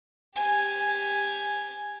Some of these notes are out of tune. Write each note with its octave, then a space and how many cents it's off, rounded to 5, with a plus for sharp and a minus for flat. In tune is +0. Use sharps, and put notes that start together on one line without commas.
G4 +20 G#5 +0